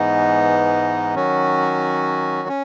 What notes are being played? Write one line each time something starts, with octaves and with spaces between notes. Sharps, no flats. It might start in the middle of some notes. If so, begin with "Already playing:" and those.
Already playing: G#2 E3 G#3 B3 D#4
D#3 F#3 C#4 F#4
C#4